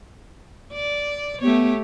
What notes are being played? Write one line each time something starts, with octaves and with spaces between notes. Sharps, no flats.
D5
A3 B3 G4 C#5